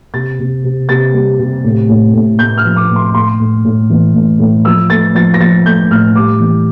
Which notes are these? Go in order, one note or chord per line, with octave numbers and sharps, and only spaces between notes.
C3 A6
C3
C3
C3 A6
G3
C3
A2
A2
A2
A2 G6
F6
F3
D6
A2
C6
A2 C6
A2
A2
E3
A2
A2
F3 E6
A3 A6
F3 A6
A#6
F3 A6
A3 G6
A2 F6
G3 D6
E3